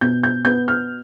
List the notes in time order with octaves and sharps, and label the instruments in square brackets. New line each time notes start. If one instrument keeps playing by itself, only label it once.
[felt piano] B2 G6
G6
B3 G6
F6